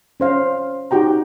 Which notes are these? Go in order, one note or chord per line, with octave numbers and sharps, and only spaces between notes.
C#4 C5 F5
D#4 F#4 G4 G5 A#5